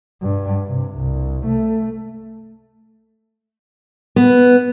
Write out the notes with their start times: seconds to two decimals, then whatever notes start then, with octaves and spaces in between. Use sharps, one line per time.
0.22 G2
0.66 C3
0.97 C2
1.46 A3
4.16 B3